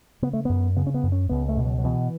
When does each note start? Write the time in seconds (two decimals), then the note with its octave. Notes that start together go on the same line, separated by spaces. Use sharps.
0.22 C#3 B3
0.33 A3
0.45 F#2 B3
0.76 C#3 B3
0.87 C#4
0.94 B3
1.03 F#2
1.12 C#4
1.29 C#2 B3
1.49 A3
1.57 B2
1.65 F#3
1.78 F#3
1.84 B2 E3